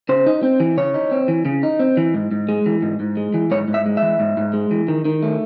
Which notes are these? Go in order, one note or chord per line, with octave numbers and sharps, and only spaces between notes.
C#3 C5
D#4
C4
E3
C#3 C#5
D#4
C4
E3
C#3
D#4
C4
E3
G#2
G#2
G#3
E3
G#2
G#2
G#3
E3
G#2 C#5
G#2
E5
G#3
E3 E5
G#2
G#2
G#3
E3
D#3
D#3
A3